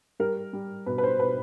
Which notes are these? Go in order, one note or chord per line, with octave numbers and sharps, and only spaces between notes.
G3 A#4
G3
B2 B4
B4
C5
B2 B4